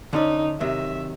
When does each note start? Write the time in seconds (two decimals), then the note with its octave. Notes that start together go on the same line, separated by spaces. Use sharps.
0.13 D3 C#4 D#4 D5
0.60 C3 D#3 F#3 E5